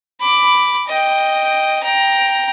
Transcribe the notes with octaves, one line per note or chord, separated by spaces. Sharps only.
B5 D6
D#5 G5
G5 A#5